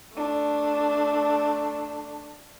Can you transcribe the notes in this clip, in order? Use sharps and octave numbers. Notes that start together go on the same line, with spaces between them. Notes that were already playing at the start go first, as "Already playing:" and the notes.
A3 D4